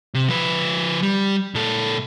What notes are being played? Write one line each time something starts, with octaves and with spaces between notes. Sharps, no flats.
C3
F3 B4
G3
A#2 A4